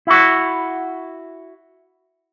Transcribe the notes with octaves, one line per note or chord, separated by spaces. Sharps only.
E4 F#4